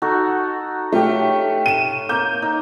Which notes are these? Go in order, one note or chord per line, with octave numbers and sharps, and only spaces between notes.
D#4 F#4 A4
A3 G4 C#5 F5
D#7 E7
A#3 G6
D#4